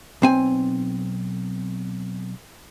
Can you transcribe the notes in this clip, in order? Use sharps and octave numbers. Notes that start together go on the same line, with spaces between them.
B1 C4 G#5